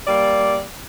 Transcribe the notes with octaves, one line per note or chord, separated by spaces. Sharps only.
G3 A#3 D5